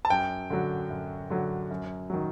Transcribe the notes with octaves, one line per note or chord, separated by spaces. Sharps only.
A5
F#2 G5
D3 F#3
F#2
D3 F#3
F#2
D#3 F#3